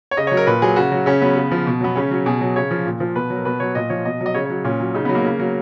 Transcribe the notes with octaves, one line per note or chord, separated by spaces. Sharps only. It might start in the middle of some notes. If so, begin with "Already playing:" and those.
C#5
C#3 D#5
F#3 C#5
A#4
A#2 B4
F#3 G#4
C#3 F#4
F#3
C#3 C#4
F#3 B3
C#3
F3
B2
F#3 B3
C#3 C#4
F#3
B2 G#4
F#3
C#3 C#5
F3
A#2
F3
B2 B4
F#3
A#4
B2 B4
F#3 C#5
A#2 D#5
F3 C#5
B2 D#5
F#3
D#5
C#3 C#5
F#3 C#5
A#2 C#4
F#3
C#3 D#4
F#3 B3
A#3
C#3
F#3